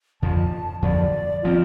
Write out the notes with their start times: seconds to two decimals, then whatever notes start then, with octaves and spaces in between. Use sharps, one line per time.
0.22 F2 D3 F3 A5
0.82 F2 D3 F3 D5
1.42 F3 C4 F4